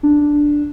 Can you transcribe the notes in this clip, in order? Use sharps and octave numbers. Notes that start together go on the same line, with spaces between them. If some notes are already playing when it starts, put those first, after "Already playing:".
D4